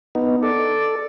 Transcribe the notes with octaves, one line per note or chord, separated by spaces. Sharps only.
B3 D#4
A4 D5